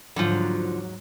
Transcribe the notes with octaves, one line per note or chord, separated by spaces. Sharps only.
D#2 G#2 D3 F3 F#3